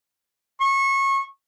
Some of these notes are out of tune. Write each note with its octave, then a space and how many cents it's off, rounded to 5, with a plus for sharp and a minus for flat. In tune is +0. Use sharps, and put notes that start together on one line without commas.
C#6 -25